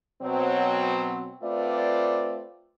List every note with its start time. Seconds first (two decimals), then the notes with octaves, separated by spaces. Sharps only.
0.22 B2 F#3 C4
1.43 A3 C4 F4 B4 D5